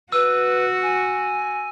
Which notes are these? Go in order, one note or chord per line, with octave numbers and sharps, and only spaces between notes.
F#4 B4 E6
G#5